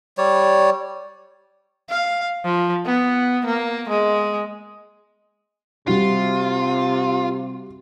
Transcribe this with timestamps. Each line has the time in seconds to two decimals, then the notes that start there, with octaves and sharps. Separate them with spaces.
0.18 G3 C#5 D5
1.90 F5
2.45 F3
2.85 B3
3.45 A#3
3.89 G#3
5.87 C3 G3 F4 F#4